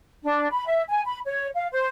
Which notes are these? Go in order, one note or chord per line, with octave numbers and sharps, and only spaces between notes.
D4
B5
E5
G#5
B5
C#5
F5
C5